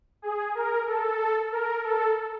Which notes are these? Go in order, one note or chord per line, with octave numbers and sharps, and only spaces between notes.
G#4
A#4
A4
A#4
A4